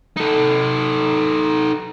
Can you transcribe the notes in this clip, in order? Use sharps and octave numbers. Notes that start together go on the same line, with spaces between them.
D#4 A4